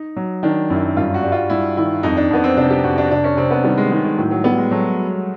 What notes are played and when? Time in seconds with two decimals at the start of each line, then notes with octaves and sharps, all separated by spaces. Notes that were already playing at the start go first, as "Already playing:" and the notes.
Already playing: D#4
0.16 F#3
0.43 D#3 D4
0.70 F#2 E4
0.97 G2 F4
1.14 F#4
1.23 G3
1.32 F4
1.50 G2 E4
1.77 D#3 E4
2.03 F2 D#4
2.17 D4
2.30 F2 B3
2.44 C4
2.57 C3 D4
2.70 G4
2.84 F2 F#4
2.98 D4
3.11 C3 D4
3.24 C#4
3.37 C3 C4
3.51 B3
3.64 D#3 G3
3.78 G#3
3.91 D#3 G#3
4.04 G#3
4.18 A2 F#3
4.31 F#3
4.44 G3 B3
4.58 G#3
4.71 F#3 A3